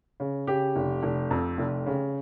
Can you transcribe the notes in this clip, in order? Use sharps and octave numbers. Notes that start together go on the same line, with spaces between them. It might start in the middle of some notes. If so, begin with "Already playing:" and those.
C#3
C#3 G4
F1
F1
F2
F1
C#3